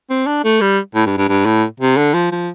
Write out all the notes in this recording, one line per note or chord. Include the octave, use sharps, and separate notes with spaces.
C4
D4
A3
G3
A2
G2
G2
G2
A2
C3
D3
F3
F3